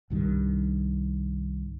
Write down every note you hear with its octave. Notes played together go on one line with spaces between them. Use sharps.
C2 G2 D#3